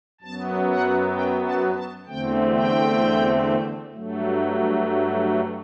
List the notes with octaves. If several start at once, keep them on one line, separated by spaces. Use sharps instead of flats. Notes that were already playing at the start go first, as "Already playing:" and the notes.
F#2 F#3 B3 A5
F#5
G5
A5
A5
E2 D3 A3 C4 G5
G5
G2 F#3 A3